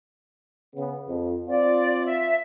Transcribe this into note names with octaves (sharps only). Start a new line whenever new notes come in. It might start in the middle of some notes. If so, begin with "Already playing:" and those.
C#3 B3
F2
C4 F4 D5
E5